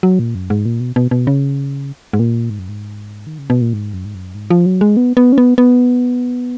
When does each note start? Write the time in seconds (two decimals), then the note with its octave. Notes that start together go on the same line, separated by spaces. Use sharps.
0.03 F#3
0.19 A#2
0.35 F#2
0.50 G#2
0.66 A#2
0.80 B2
0.96 B2
1.11 B2
1.27 C#3
2.13 G#2
2.19 A#2
2.50 G#2
2.59 F#2
2.69 G#2
3.27 D#3
3.38 C#3
3.50 B2
3.61 A#2
3.73 G#2
3.93 F#2
4.05 G#2
4.15 F#2
4.35 G#2
4.51 F3
4.66 F#3
4.81 G#3
4.97 B3
5.17 B3
5.32 C#4
5.38 B3
5.58 B3